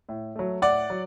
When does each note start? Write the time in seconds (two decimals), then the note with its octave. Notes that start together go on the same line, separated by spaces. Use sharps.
0.09 A2
0.36 F#3 A3
0.62 A2 D5 F#5
0.90 F#3